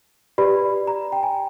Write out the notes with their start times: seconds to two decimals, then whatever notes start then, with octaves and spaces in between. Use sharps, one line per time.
0.38 G4 B4 D5 B5
0.87 A#5
1.12 G5
1.23 G#5